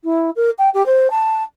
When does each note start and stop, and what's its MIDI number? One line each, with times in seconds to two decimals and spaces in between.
0.04 0.30 64
0.36 0.50 70
0.58 0.69 79
0.74 0.85 67
0.86 1.08 72
1.10 1.43 81